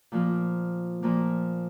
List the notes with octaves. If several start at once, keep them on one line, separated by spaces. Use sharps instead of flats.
A#2 F3 A#3 F4
A#2 F3 A#3 F4